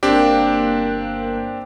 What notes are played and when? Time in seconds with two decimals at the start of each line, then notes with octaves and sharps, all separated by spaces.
0.03 G1 A#3 C4 D4 G4 F#6